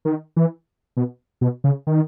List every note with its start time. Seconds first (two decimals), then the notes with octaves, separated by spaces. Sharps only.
0.05 D#3
0.37 E3
0.97 B2
1.41 B2
1.64 C#3
1.87 D#3